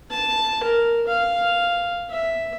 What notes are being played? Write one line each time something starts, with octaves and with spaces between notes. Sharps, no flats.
A5
A#4
F5
E5